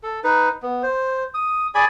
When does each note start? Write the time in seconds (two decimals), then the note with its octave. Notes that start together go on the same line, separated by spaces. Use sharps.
0.03 A4
0.24 D#4 B4
0.63 B3
0.83 C5
1.34 D#6
1.75 G#4 D5 G#5 B5